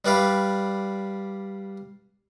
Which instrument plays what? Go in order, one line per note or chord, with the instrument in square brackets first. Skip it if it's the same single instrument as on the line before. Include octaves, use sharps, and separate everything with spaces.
[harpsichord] G3 B4 D5 F5